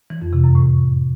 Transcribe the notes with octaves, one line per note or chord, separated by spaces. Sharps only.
E3
F2
C3
F#2
A2